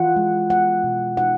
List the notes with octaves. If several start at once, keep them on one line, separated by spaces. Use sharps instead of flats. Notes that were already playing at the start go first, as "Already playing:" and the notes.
Already playing: E3 F4 F#5
G#3
B3 F#5
B2
D#4 F#5